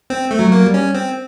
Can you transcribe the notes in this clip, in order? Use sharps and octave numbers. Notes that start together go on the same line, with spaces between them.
C4
A3
F#3
A#3
G3
C#4
C4